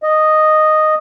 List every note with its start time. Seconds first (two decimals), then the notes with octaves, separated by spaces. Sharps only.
0.03 D#5